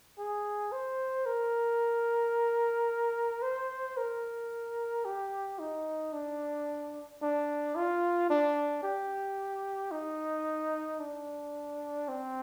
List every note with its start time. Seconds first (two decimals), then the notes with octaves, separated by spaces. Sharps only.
0.18 G#4
0.72 C5
1.26 A#4
3.42 C5
3.97 A#4
5.05 G4
5.59 D#4
6.13 D4
7.22 D4
7.76 F4
8.30 D4
8.83 G4
9.91 D#4
11.00 D4
12.08 C4